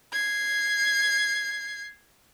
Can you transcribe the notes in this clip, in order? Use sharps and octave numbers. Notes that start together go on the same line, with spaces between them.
G#6 C7